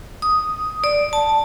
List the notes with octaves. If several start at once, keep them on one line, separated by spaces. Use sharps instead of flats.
D#6
D5
A5